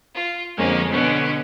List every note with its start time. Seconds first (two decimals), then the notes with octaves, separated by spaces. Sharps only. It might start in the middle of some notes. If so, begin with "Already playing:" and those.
0.14 F4
0.57 F2 D3 F3 G#3 A#3 C#4
0.89 B2 D3 B3 C#4